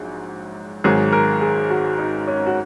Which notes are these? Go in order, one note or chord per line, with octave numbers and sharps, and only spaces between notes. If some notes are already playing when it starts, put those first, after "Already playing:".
Already playing: A#1 G#2 F#3
G#1 G#2 D#3 F#3 G#4
A#4
G#4
F#4
D#4
C#4
F#4